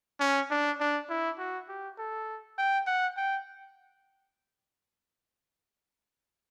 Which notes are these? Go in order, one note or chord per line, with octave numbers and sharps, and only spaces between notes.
C#4
D4
D4
E4
F#4
G4
A4
G5
F#5
G5